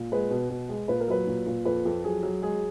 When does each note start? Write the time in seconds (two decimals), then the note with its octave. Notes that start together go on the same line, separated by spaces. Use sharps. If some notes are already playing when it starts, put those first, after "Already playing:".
Already playing: A#2
0.12 G#3 B4
0.31 B2
0.50 B2
0.69 G#3
0.88 A#2 B4
1.00 A#4
1.08 F#3 B4
1.27 A#2
1.46 A#2
1.65 F2 B4
1.85 F2
2.04 F#3 G#4
2.23 F#3
2.42 G#3 G#4